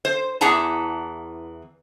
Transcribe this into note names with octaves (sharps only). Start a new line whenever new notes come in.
C5
E2 E3 G#4 F#5 A5 A#5